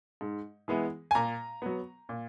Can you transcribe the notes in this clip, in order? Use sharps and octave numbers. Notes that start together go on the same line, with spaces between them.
G#2
E3 G#3 B3 E4
G#5
A#2 A#5
F#3 B3
A#2